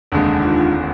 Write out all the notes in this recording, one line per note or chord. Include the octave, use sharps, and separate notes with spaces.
F1 D#2 D3 G#3 D4
D#4
F4
F4
G#3